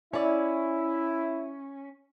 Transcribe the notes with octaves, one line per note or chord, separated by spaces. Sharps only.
C#4 E4 C#5 D5